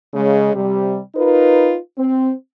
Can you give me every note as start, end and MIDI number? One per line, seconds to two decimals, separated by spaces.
0.14 0.52 49
0.14 0.52 56
0.54 0.97 48
0.54 0.97 55
1.15 1.76 63
1.15 1.76 65
1.15 1.76 70
1.15 1.76 71
1.98 2.31 60